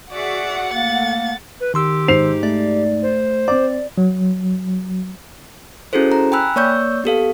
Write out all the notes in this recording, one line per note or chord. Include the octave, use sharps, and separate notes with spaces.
F#4 G#4 D5 E5 F#5
A3 A#3 A6
B4
D#3 G4 C6 E6
G#2 C5 C7 F7
A3 D5
C5
C4 D5 D6
F#3
C#4 E4 F#4 G#4 A4 C5
A#5
G5 G#5 B5 E6 F#6
A#3 C#5 D5 C#6 E6 G6
B3 G4 A4 F5